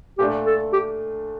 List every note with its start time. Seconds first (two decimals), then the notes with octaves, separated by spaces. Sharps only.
0.19 A#2 A3 D4 G4
0.47 A4
0.73 G4